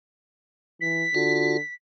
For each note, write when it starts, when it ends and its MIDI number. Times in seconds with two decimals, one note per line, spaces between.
0.81 1.06 52
0.81 1.74 95
1.14 1.58 50
1.14 1.57 65
1.14 1.57 66